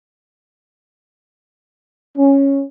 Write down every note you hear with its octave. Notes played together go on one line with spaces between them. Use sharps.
C#4